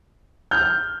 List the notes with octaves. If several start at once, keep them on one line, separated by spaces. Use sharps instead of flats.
F6 G6